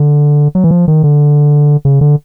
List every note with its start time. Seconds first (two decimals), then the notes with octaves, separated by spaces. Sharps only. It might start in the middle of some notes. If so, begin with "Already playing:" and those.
Already playing: D3
0.55 F#3
0.64 E3
0.71 F3
0.88 D#3
1.04 D3
1.85 C#3
2.01 D3